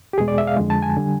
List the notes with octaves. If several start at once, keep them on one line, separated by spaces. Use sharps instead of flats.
G4
E2 B2 G#3 G#4
D5
E5
F5
F2 D3 F3 G#3
A5
G#5
D3 G3